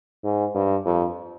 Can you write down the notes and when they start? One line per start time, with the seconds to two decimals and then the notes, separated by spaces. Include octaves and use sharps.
0.23 G#2
0.55 G2
0.85 F2